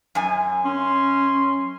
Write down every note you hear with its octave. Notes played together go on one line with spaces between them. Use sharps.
F#2 G#5
C#4 C6